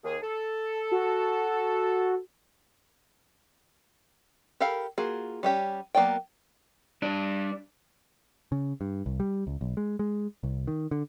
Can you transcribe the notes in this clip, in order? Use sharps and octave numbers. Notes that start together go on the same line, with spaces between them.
D#2 G#4
A4
F#4
G4 A4 A#4 F5 B5
A#3 F4 F#4 G#4
G3 C#4 G4
F#3 A#3 B3 D5 G5
G3 D4 D5
C#3
G2
C2
G3
C#2
B1
G#3
G#3
C2
D#3
D3